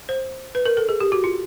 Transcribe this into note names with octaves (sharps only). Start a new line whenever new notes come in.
C5
B4
A#4
A4
G#4
G4
F#4
F4